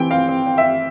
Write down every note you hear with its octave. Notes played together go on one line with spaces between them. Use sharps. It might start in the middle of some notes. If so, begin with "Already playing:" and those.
Already playing: E3 C4 G5
C4 F5
C4
C4
E5
C4